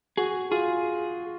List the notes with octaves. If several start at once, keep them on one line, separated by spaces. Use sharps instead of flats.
F#4 G#4
F4 G#4